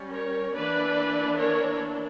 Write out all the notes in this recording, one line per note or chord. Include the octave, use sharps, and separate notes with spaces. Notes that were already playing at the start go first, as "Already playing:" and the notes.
Already playing: G3 C#4
A#4 C#5
E3 A#3 D4 B4 D5
A#4 C#5